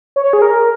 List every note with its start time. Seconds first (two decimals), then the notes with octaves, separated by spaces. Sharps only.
0.16 C#5
0.33 G#4
0.42 A#4